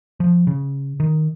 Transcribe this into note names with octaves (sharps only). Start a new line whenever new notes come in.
F3
C#3
D#3